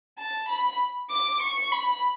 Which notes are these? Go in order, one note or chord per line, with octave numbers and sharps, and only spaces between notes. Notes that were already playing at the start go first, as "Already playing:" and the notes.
A5
B5
D6
C#6
B5